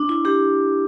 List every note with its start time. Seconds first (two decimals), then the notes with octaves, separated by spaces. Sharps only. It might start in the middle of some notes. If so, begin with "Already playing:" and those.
Already playing: D4
0.09 E4
0.25 D4 G4